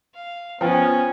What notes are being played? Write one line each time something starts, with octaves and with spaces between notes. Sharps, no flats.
F5
F3 B3 C#4 B4 C5 G5